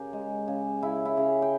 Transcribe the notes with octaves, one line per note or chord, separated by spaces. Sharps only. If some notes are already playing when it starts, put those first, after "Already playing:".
Already playing: C#3 G4 A#4
G#3
C#3
C#3 E4
E4
C#3
G5